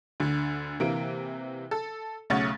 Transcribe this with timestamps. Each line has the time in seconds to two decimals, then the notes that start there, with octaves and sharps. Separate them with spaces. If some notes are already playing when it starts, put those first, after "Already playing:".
0.20 D2 D3
0.80 C3 E3 A#3 D7
1.71 A4
2.30 B1 C#3 A3 C#5 F#5 A6